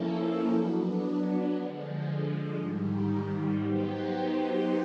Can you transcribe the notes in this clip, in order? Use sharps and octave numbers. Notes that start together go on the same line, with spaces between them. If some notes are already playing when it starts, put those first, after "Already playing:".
Already playing: F3 A#3 C#4 E4 A4
F#3 B3 D4
D3 F3 G#3
G#2 D#3 G3
F#3 B3 D#4 G4 C5